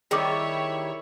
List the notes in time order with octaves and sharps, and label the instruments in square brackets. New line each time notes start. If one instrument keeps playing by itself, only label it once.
[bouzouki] D#3 G3 [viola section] E4 C#5 [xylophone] G#4 D6